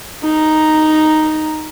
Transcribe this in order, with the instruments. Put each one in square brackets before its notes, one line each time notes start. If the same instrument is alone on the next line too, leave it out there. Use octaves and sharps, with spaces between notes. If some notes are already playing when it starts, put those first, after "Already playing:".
[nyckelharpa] D#4 A#5